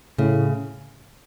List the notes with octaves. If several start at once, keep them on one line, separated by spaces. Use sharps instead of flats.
A2 C#3